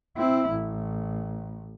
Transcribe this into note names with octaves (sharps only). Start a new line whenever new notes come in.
C4 E4
A1